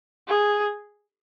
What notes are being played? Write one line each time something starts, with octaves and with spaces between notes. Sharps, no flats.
G#4